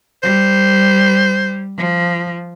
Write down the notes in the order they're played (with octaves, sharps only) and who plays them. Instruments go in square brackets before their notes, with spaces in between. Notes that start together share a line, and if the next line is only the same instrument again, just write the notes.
[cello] G3 [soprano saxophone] C5
[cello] F3